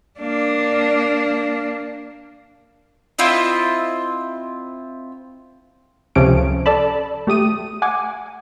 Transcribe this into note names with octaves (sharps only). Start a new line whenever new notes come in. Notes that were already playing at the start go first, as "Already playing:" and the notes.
A#3 D4
C4 E4 F4 D#5
C#2 C3 F3 C#4 A4 D7
A4 D5 A5 B5
A3 G4 D#6 D#7
F#5 G#5 D6